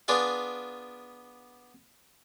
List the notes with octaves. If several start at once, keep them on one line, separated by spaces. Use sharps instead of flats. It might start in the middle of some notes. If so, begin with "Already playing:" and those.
B3 D4 F4 G#4 D5 F5